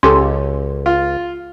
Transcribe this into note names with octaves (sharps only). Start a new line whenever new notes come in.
C#2 C#4 G4 A4 C6
F4